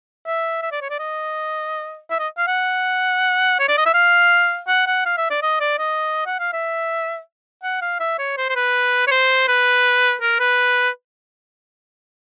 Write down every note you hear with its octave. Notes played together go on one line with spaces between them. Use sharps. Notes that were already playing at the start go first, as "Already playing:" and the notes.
E5
E5
D5
C#5
D5
D#5
E5
D#5
F5
F#5
C#5
D5
D#5
E5
F5
F#5
F#5
F5
E5
D5
D#5
D5
D#5
F#5
F5
E5
F#5
F5
E5
C#5
C5
C5
B4
C#5
C5
B4
A#4
B4